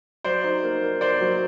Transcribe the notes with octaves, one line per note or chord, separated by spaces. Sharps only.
F#3 C5 D5
D#4
A#3
A#3
A#3 C5 D5
F#3